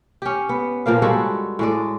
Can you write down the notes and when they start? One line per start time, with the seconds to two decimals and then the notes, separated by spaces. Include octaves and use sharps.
0.22 C#4 G4
0.49 B3
0.86 A#2 F3 A#3 F5
1.02 G3 G#3 F#4 A4
1.59 A2 G#3 D5